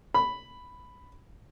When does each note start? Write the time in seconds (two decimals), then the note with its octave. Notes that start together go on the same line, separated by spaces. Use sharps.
0.14 B5